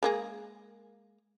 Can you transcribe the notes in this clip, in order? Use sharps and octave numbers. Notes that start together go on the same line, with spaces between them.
G#3 A#3 G#4